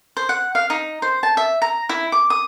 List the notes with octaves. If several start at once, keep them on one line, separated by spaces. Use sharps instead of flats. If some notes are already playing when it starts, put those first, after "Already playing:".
C5
F#5
F5
D#4
C5
A5
E5
A#5
E4
D6
D#6